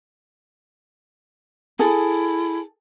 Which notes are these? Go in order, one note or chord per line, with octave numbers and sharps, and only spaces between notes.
E4 G#4 A4